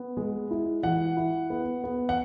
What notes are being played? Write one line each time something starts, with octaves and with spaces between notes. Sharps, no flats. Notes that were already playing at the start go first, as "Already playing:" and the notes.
Already playing: B3
G#3
E4
E3 F#5
E4
B3
B3
F#5